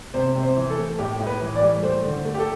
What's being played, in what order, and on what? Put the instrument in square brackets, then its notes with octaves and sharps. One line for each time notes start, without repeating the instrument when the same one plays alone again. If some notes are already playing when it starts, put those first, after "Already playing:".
[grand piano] C3 C5
C3
C5
E3
A4
A3
A2 G4
A2
B4
E3
D5
G3
A3 C5
D3
A3
G4
A4